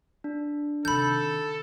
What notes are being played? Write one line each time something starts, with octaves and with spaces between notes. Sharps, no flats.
D4
C3 D#3 A4 B5 G6